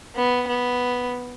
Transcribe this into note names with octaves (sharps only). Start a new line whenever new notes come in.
B3
B3